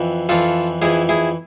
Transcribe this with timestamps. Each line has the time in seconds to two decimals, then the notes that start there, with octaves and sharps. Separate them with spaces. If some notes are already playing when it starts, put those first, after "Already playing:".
Already playing: F2 E3
0.29 F2 E3 F4 A4
0.82 F2 E3 E4 G#4
1.09 E4 G#4